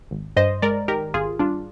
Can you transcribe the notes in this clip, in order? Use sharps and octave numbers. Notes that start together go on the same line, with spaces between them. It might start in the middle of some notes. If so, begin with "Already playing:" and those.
G#1
G2 C5 D#5
G#3 A#4 D5
D#3 G4 A#4
G#1 F4 G#4
G2 D4 F4